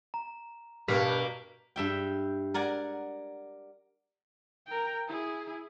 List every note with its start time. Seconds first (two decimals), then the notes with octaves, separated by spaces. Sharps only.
0.14 A#5
0.88 G2 B2 A#3 B6
1.76 G2 E5 G5
2.54 A#4 D5 F#5 G#5
4.66 A#4 G5
5.07 E4 G#4